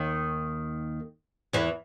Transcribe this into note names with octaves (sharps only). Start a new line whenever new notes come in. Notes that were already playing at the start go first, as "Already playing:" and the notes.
Already playing: D#2 D#3
E2 E3